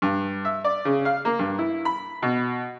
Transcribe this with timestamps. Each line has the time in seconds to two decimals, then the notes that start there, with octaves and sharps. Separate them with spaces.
0.02 G2
0.45 E5
0.64 D5
0.85 C#3
1.05 F5
1.25 A#3
1.39 G2
1.59 E4
1.85 B5
2.22 B2